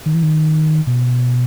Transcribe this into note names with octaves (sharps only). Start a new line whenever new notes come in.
D#3
E3
D#3
B2